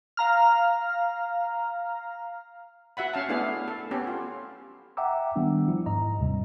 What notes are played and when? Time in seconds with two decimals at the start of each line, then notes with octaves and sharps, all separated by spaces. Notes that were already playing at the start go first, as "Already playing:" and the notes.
0.17 F5 A#5 F6
2.97 F#4 E5 F#5 B5
3.14 C#4 F5 A5
3.29 A3 B3 D4 E4 G#4 F5
3.68 A4
3.91 B3 C#4 G4 A4
4.07 F4
4.97 E5 F#5 G5 A#5 D6 E6
5.36 D#3 G3 B3 D4
5.68 F3 E4
5.86 G#2 D#5 A#5
6.19 D#2 C3 G3